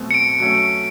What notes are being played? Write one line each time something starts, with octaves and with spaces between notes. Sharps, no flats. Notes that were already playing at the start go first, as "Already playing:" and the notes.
Already playing: B2 F#3 A3 C4
C#7
D7
F#3 A3 C#4